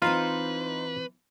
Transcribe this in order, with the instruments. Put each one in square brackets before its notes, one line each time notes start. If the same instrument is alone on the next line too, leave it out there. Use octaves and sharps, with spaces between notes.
[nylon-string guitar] E3 C4 [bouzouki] D#4 C5 [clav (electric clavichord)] F4 [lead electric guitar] B4